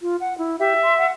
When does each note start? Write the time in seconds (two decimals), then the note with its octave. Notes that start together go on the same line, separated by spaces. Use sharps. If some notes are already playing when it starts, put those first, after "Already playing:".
0.02 F4
0.20 F#5
0.38 E4
0.59 G4 E5
0.83 C6
0.98 F#5